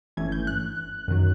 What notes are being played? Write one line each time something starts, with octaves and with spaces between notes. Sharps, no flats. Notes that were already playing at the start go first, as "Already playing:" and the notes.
G1 G2 E3 A3 C#4 G#6
G6
F#6
F#2 D#3 F#3